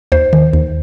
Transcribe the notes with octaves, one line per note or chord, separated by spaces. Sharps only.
D#2 C5
D#3
D#2